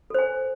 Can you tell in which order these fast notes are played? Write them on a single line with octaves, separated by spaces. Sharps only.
A4 C5 G#5